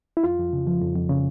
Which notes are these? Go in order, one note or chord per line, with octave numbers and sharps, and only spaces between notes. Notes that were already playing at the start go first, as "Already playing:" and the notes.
E4
F2 F4
F2
C#3
F3
F2
F2
C#3